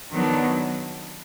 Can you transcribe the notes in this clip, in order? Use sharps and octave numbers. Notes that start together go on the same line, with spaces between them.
D#3 F#3 B3 D4